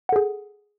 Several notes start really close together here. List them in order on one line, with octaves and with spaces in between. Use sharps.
F#5 A4 G#4